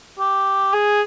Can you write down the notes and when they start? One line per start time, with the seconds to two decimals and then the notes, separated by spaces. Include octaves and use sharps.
0.19 G4
0.73 G#4